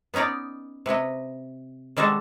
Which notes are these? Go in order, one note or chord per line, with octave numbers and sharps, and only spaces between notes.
B3 C#4 D#4 C#5 D5
C3 B4 C#5 D#5
D#3 G3 G#3 F#4 A4